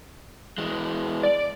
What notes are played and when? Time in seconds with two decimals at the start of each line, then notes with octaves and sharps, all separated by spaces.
0.58 E3 G#3
1.23 D5